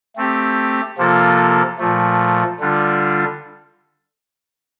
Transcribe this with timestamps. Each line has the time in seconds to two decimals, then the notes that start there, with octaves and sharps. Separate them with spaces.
0.16 A3 C4 G4
0.98 C3 F3 A#3 F4 A4
1.78 A#2 F3 A3
2.60 D3 G3 D4 F4